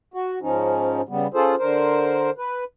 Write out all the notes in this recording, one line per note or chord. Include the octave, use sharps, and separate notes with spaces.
F#4
G#2 F3 C#4 D#4
C#3 G3 B3
C#4 F4 G#4 A4 C5
D3 A#4 C5
B4